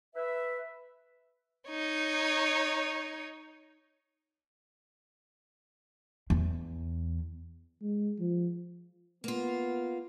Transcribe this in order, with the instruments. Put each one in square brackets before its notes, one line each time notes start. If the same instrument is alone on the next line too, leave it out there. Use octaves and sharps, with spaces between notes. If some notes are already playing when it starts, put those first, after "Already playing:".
[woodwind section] B4 E5
[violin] D#4 C#5
[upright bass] E2
[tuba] G#3
F3
[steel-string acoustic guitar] A#3 F4 [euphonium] B3